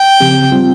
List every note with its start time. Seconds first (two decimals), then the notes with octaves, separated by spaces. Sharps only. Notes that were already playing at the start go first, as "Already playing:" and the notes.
Already playing: G5
0.20 C#3 F3 C4 G4
0.52 G3 C4 F4